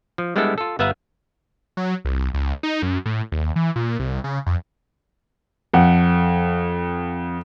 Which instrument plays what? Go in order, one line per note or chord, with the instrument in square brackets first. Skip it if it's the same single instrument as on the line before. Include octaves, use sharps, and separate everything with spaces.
[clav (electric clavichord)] F3
G3 G#3 B3 D4 E4 A4
F4 A4
G1 B3 B4 E5 F5 A#5
[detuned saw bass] F#3
C2
C#2
D#4
F#2
A2
D#2
E3
A#2
C2
C#3
F2
[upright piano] F2 F#5